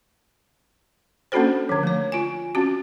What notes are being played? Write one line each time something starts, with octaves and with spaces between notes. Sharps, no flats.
A#3 C#4 D4 F#4 A4 C5
D3 F3
A3 C#5
F4 G#5
C4 C#4 F#4